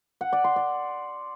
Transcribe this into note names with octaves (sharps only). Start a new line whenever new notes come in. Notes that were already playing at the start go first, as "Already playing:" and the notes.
F#5
D5
C6
D5